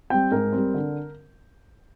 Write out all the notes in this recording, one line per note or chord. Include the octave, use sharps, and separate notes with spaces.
G3 C4 G5
G#2 A#4
G3 C4
D3